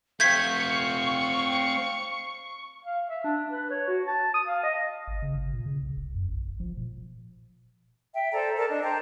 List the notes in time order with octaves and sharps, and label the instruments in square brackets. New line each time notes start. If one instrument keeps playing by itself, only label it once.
[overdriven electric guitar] A3 C4 [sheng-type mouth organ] F5 [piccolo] C#6 [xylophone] G6 G#6 B6
[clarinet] F5
E5
D4
B4
C#5
F#4
A5
D#6
F5
D#5
[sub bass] G#1
C#3
G#1
A#2
C#3
C2
F1
F#2
A#1
F1
F3
A#2
[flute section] E5 G5
A4 C5 D5 A#5
A4 A#4 D5 A5
D4 D#5
C5 G5 A5 A#5